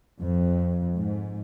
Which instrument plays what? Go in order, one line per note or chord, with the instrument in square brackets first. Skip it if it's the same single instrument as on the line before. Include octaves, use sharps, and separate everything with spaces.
[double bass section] F2
G#2